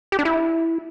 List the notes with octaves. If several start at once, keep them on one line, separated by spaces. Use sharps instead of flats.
G4
D4
E4